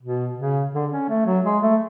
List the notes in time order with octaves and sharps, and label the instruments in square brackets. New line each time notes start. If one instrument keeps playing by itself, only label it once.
[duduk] B2
C#3
D3
C#4
A3
F#3
G#3
A3